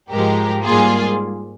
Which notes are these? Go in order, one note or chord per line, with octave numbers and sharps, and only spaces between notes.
G#2 F3 G#3 G4 A#4
G#2 G3 A#3 F4 G#4